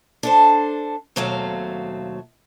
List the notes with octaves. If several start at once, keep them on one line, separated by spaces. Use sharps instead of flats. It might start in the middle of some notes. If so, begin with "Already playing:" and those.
D4 A4 C5
D#2 B2 F#3 A3 C4 F5